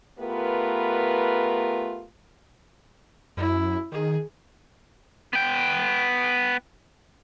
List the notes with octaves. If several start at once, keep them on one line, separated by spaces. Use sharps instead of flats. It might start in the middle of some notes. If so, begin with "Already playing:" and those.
A3 B3 F4 G4 A#4 B4
F#2 E4
D#3 G#4
B3 G5